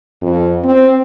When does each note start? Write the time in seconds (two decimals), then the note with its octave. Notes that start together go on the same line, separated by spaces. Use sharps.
0.22 F2
0.64 C4